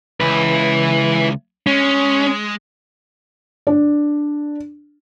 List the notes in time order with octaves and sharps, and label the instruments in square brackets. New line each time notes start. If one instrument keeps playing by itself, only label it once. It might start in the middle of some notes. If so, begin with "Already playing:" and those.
[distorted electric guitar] C#2 [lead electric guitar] E4 B4
[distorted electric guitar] G#3 [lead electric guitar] C#4
[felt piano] D4